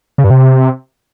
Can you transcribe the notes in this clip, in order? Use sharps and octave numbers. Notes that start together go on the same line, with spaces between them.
C#3
G2
C3